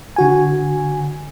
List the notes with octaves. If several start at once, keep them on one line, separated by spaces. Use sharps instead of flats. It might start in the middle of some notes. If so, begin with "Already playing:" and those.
D3 F#4 G#5